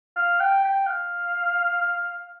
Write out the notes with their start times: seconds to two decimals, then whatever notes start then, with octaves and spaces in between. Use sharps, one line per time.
0.16 F5
0.40 G5
0.64 G5
0.87 F5